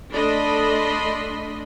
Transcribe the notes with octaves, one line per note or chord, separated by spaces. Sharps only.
A3 D4 A4 D#5 B5 C6